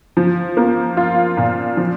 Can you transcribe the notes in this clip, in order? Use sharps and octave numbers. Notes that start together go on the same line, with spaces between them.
F3
A#3
F4
A#2
F3